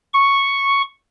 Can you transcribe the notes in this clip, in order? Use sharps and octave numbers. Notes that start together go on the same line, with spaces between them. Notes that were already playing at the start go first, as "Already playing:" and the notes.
C#6